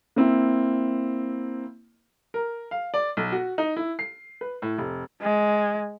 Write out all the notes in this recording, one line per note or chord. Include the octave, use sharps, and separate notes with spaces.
A#3 C4 E4
A#4
F5
D5
B1
F#4
D#4
E4
C7
B4
A2
F1
G#3